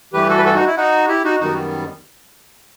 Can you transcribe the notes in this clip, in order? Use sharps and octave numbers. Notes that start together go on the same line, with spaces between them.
G2 E3 A3 G4 B4
F#4 A4
B4
F#4 A4
D#4 F#4
E4
D#4 F#4
E4 G4
D#4 F#4
F#2 D#3 G3 B3 D#4 F#4